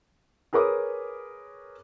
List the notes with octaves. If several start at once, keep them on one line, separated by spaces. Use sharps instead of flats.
G#4 A#4 B4 C#5 D6 D#6